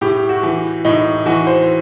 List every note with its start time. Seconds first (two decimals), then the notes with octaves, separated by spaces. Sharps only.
0.01 A2 G4
0.29 F#4
0.43 E3
0.85 A2 D#4
1.26 E3 F#4
1.47 C5